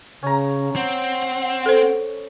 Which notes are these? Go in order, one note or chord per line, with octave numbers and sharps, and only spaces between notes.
C#3 C#4 A#5
C4 F#5
A4 C5